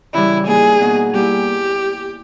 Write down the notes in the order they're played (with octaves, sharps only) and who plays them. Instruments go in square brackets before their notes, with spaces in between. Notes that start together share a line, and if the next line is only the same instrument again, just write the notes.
[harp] C#3 E3 G3 [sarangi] E4
[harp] G3 A#3 D#4 [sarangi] G#4
[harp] B2 A#3 D#4
[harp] G3 A#3 E4 [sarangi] G4